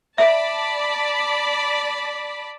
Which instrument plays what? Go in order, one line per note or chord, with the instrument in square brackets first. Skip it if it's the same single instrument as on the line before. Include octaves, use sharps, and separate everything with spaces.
[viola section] D5 A5 B5 [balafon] E5